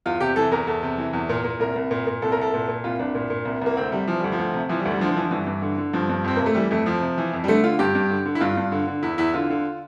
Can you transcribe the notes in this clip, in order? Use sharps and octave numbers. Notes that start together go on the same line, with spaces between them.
E2 F4
C3 G4
E3 A4
E2 A#4
E2 A4
C3
E3
E2
A#2
A#2
C2 A#4
C2
A#2
A#2
C2 A4
A#4
C2 A4
A#2
A#2
C2 F4
C2 D4
A#2
A#2
C2
C2 A#3
D2 C4
C3 G3
E3 F3
D2 G3
F3
D2
C3
E3 F3
G3
D2
G3
D3 F3
F3
D3 E3
F3
G2 E3
G2
D3
D3
G2 F3
G2
F2 C4
C3 A#3
A3
E3 G3
F2 A3
F2 F3
C3
E3
F2
G3
D3 A3
D3 F4
G2 G4
G2
D3
D3
E4
G2 F4
G2
D3
D3
E2 E4
E2 E4
D3 F4
D3